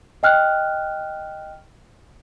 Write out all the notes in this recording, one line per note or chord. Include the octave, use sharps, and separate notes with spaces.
D#5 G5 F6 F#6